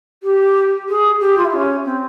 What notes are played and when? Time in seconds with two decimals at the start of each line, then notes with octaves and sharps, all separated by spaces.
0.22 G4
0.88 G#4
1.19 G4
1.37 F4
1.44 E4
1.53 C#4
1.84 C4